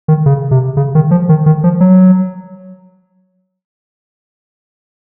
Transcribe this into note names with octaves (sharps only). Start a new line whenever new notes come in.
D#3
C#3
C3
C#3
D#3
F3
D#3
D#3
F3
F#3